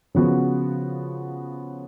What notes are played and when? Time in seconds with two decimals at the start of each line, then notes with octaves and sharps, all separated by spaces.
0.15 C#3 F3 B3 F#4